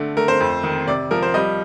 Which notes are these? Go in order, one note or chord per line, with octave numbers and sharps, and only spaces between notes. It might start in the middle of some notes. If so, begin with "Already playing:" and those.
Already playing: D3 A3
A3 A#4
C5
F2
D#3
C3 D5
F3 A#4
C5
G3 D#5